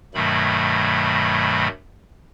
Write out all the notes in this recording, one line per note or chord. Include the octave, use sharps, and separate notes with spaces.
G2 B2 D#3 F#3 A3 B5